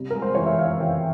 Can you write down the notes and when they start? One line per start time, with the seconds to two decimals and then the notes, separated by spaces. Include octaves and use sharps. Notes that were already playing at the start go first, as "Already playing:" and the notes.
Already playing: C3 G3
0.10 G#3 A#4
0.22 C5
0.35 E3 C#5
0.46 E5
0.58 E3 F5
0.80 E3 G5